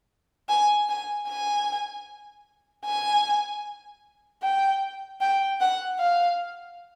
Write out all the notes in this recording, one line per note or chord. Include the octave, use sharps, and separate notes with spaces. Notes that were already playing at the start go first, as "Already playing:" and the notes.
G#5
G#5
G#5
G#5
G5
G5
F#5
F5